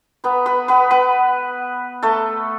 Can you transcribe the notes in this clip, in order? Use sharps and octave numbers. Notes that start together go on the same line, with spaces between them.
B3 B4
B3 B4
B3 B4
B3 B4
A3 A4